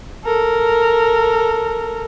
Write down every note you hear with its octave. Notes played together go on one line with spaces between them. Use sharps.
A4 A#4